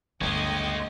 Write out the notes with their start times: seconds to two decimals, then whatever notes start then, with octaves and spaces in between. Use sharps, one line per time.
0.21 G1 D2 G#3 C#4 D#5 G5